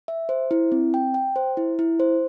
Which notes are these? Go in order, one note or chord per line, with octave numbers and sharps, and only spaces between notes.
E5
C5
E4
C4
G5
G5
C5
E4
E4
C5